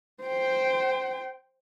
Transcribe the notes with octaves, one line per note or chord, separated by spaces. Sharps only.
C5 G5